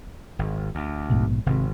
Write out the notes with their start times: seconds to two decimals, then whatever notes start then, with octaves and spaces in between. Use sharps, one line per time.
0.39 G#1
0.75 D2
1.10 A#1 G#2 B2
1.46 G#1 C3